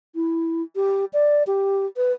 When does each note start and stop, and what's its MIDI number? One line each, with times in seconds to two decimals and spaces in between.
0.15 0.62 64
0.76 1.05 67
1.13 1.43 74
1.47 1.86 67
1.97 2.12 71